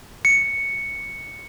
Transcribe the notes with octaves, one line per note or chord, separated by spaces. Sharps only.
C#7